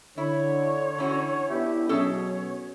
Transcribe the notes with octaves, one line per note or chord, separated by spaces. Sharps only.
D3 E4 C#5
E3 C#4 F#4
B3 D4 E4 G4
B2 F#3 C#4 G#4 A4 C#5